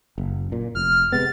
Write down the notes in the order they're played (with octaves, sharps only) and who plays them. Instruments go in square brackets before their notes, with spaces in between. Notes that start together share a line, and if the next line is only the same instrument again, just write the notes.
[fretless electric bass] F#1
A#2
[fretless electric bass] F1 [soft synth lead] F6
[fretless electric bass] C3 G#3 B3 [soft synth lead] A6